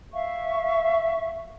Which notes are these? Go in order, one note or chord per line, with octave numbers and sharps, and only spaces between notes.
E5 F5 C#6